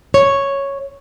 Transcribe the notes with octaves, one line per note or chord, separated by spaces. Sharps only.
C#5